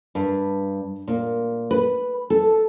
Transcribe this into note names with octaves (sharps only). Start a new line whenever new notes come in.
G2
A#2
B4
A4